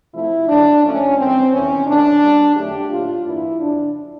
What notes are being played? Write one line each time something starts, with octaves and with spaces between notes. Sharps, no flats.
C3 F3 A3 E4
G2 D3 F#3 D4
G#2 F3 A3 C#4
G2 E3 G#3 C4
E2 C3 D#3 C#4
C3 E3 A3 D4
B2 G3 A#3
F2 D3 F#3 A3 G4
A2 F#3 A#3 F4
G2 E3 G3 A#3 E4
F2 C#3 F3 D4